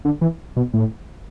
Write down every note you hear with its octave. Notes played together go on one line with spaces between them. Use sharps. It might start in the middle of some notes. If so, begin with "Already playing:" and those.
D3
E3
B2
A2